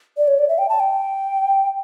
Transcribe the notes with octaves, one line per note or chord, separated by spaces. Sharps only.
D5
C#5
D5
E5
G5
A5
G5